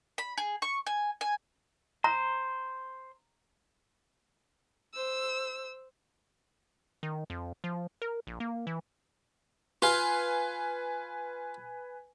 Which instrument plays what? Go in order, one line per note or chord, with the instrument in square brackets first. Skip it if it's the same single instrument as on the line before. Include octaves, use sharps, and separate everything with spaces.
[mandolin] B5
G#4
C#6
G#5
G#5
[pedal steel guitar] C5 [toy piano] A#5
[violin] C5 E6
[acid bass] D#3
F2
F3
A#4
A#1
A#3
E3
[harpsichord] F4 F5 [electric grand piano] B4 G#5